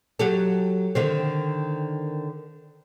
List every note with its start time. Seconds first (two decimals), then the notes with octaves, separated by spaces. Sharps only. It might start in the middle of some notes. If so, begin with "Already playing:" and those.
0.19 F#3 G4 A4
0.95 D3 D#3 C4